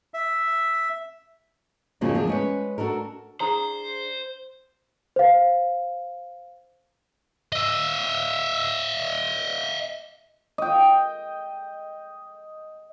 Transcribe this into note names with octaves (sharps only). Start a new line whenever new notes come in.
E5
F2 C#3 F3 F#3 A#3 D4
E2 F3 D4 G#4
G#3 C#4 B4
D4 F#4 A4 A#4
D4 G#4 C5 A#5
C5 F5
D#5 E5
D#5 G5